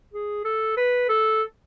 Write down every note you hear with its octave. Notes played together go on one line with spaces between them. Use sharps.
G#4
A4
B4
A4